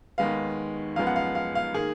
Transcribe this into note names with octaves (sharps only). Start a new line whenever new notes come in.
D#2 D#3 G#3 B3 F5
F#2 F3 G#3 B3 F5
F#5
F5
F5
F5
D#3 A#3 G#4